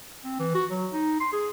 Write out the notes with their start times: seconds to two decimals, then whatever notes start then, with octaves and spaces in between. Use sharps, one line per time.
0.24 C4
0.39 E3
0.55 F#4
0.71 F#3
0.93 D#4
1.20 C6
1.33 G#4